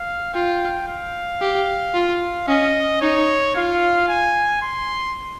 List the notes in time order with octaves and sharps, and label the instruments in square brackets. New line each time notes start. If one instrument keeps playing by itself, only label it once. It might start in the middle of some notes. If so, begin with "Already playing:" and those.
Already playing: [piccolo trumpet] F5
[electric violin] F4 [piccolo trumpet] G5
[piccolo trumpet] F5
[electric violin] G4
F4
[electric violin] C#4 [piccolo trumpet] D#5
[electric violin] D#4 [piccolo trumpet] C#5
[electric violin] F4 [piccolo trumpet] F5
[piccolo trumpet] G#5
C6